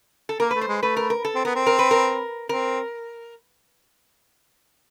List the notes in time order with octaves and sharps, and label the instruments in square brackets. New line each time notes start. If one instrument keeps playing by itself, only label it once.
[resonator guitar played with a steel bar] A4
[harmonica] A#3 [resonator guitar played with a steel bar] A#4
[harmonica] A3 [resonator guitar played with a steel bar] B4
[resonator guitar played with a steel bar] C5
[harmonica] G#3
[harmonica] A3 [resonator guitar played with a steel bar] B4
[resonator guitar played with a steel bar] A#4
A#4
A4
[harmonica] C4
[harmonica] B3 [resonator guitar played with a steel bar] A#4
[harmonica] C4
[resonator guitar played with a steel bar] A#4
B4
A#4
[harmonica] C4 [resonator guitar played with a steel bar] A#4